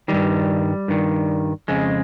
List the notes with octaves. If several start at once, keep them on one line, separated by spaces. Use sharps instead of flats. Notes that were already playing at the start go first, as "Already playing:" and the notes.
G2 D#3 G3
G2 D#3
F2 C#3 G#3